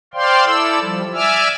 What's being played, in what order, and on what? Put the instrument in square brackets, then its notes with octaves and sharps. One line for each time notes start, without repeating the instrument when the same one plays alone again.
[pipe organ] C5 D5 F5 G5 C6
E4 A4 D5 E6
F3 G3
D5 E5 G#5 D6 E6 F6